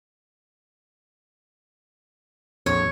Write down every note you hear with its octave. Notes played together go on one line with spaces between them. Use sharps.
A#1 F2 C#5